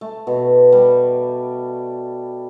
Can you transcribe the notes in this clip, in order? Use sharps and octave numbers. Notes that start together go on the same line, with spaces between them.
A3
B2
G3